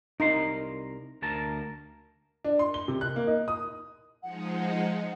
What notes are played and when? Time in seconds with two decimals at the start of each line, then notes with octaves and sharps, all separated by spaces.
0.20 C2 D#4 A#4 C6
1.22 D2 A#4 A5
2.44 D4
2.59 C6
2.74 G7
2.88 C3
3.01 F#6
3.16 A#3
3.27 D#4
3.48 D#6
4.22 F3 G#3 D#4 F#5